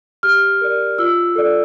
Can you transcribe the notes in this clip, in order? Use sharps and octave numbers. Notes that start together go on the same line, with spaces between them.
G4 F6
A#4 D5
F4 E6
A4 D5